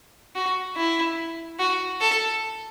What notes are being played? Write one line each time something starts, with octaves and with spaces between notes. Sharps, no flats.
F#4
E4
F#4
A4